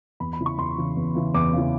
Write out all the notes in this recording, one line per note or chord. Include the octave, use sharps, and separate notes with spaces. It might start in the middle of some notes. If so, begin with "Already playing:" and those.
E2 B5
B5
C#3 E3
C#6
E2 C6
C#3 E3
E2
C#3 E3
E2 D6
C#3 E3